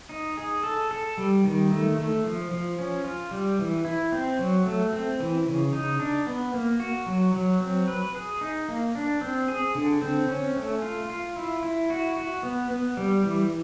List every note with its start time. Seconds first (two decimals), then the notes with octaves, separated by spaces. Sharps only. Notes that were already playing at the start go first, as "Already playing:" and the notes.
0.09 D#4
0.37 G#4
0.64 A4
0.91 A4
1.18 G3
1.44 D#3
1.71 A3
1.97 A3
2.24 F3
2.51 F3
2.79 C#4
3.04 F4
3.31 G3
3.59 E3
3.85 E4
4.12 C4
4.39 F#3
4.66 A3
4.93 C4
5.20 E3
5.46 C#3
5.73 D#4
5.99 D4
6.27 B3
6.54 A#3
6.80 F#4
7.06 F#3
7.34 F#3
7.60 C4
7.88 B4
8.15 G#4
8.41 D#4
8.68 A#3
8.95 D4
9.21 C4
9.48 G#4
9.75 D3
10.02 C4
10.28 C#4
10.56 A3
10.82 F4
11.10 F4
11.36 E4
11.63 E4
11.90 F#4
12.16 F#4
12.43 B3
12.71 B3
12.97 G3
13.24 E3